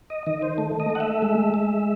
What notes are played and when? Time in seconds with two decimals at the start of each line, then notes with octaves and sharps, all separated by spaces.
0.10 D#5
0.26 D#3 D#5
0.42 C5
0.58 A3
0.80 D#5
0.90 A3
0.95 F#5
1.00 E5
1.22 G#3
1.54 G#3